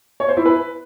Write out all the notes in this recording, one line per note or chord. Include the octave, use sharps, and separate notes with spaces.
C#5
C5
E4
B4